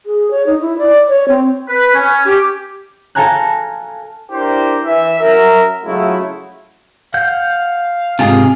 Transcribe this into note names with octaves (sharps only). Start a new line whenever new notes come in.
G#4
C#5
D#4
E4
D5
C#5
C4
B4
C#4
G4
A4 F5 G#5 A#5 F#6
D4 E4 G4 A#4 C5
E3 E5
F#2 A#4 E5
C#3 F#3 G#3 A3 E4 F4
F5 F#5 G6
G#2 C3 F4 G#4